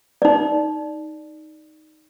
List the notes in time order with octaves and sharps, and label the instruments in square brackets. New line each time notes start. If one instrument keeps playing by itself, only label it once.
[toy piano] D#4 D5